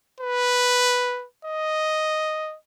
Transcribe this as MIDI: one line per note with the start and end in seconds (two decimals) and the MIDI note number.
0.20 1.25 71
1.45 2.56 75